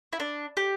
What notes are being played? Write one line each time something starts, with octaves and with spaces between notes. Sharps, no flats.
E4
D4
G4